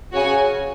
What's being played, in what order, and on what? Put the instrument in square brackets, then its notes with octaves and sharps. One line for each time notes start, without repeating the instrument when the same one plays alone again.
[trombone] C#3 [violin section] F#4 C#5 G#5